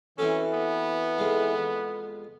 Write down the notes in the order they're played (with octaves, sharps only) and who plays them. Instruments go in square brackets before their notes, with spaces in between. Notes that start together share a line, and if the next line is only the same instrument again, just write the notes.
[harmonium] E3 [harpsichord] C4 F#4 A4 [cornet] C#4
[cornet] B3
[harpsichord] F2 G#3 F4